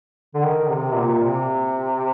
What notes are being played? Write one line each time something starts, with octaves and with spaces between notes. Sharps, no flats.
D3
D#3
C3
A#2
C3